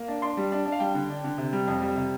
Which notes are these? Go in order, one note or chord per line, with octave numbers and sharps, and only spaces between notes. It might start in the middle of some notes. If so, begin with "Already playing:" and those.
Already playing: A#3
D4
D4 C6
G3
D4
D4
F5
G3 G5
D3
D4
D3
C3
G3
F2
G3
C3